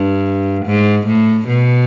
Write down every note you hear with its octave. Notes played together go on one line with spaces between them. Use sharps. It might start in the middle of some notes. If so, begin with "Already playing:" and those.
Already playing: G2
G#2
A2
B2